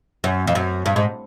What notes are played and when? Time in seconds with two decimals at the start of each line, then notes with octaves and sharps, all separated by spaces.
0.24 F#2
0.47 F2
0.55 F#2
0.86 G2
0.96 G#2